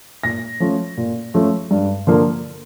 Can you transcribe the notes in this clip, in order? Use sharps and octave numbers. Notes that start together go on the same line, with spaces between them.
A#2 A#6
F3 A3 C#4
A#2
F3 A3 C#4
G2
D3 F3 A#3